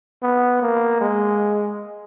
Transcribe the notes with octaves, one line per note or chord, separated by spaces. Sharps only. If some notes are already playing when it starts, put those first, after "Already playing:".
B3
A#3
G#3